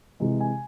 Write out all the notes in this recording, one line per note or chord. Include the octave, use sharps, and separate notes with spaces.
C3 E3 G#3
G#5